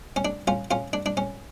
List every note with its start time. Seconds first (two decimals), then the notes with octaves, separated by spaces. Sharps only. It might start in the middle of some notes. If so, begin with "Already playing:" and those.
0.16 C#4
0.25 D4
0.48 C#4 F4
0.71 C#4 F4
0.93 D4
1.06 D4
1.17 C#4